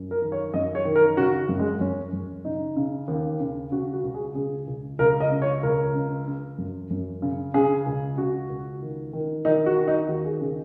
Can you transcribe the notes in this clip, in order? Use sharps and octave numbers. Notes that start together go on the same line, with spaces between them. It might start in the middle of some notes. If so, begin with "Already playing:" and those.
Already playing: F#2
A#4
D#3
C#5
F#2 D#5
C#5
D#3
A#4
C#3 F#4
F#2
G#3
F#2 C#4
F#2
C#3 D#4
C#3
D#2
C#3
C#3 F#4
F#4
C#2
G#4
C#3 G#4
C#2
C#2 A#4
D#5
C#3
C#5
C#2 A#4
C#3
C#3
F#2
F#2
C#3
C#3 G#4
C#2
C#3 F#4
C#2
D#3
D#3
D#3 D#4
F#4
D#3
D#4
D#2 F#4
G#4
C#3 G#4